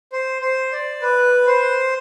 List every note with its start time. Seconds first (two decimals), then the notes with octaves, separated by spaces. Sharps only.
0.13 C5
0.42 C5
0.72 D5
1.02 B4
1.47 C5